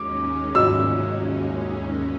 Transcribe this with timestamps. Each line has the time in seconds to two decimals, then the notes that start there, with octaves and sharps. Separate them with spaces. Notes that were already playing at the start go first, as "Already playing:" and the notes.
Already playing: D#2 D#3 G#3 C#4 D6
0.55 E6